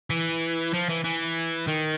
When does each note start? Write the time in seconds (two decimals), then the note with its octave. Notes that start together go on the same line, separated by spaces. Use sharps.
0.10 E3
0.73 F3
0.89 E3
1.04 E3
1.68 D#3